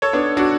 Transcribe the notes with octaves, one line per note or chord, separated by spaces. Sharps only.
A4 C#5
B3 D4
D4 F#4